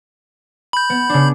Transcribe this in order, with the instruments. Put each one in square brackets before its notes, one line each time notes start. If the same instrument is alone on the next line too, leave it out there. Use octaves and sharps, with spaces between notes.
[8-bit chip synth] B5 G6
[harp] B3
C#3 D4